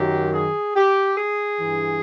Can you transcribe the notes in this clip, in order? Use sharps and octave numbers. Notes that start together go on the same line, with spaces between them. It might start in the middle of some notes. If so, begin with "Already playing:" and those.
Already playing: F#2 D#3 F#3 G4
G#4
G4
G#4
G2 E3